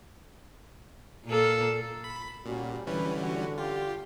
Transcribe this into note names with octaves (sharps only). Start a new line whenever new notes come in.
A#2 A#3 A4
B5
A#2 G3 C#4 F#4
D3 E3 G3 C#4 B4
F#4
F4 G4